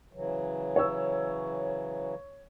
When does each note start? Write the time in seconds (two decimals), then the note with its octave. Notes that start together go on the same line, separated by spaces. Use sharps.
0.13 C#3 E3 F#3
0.76 C#5 E6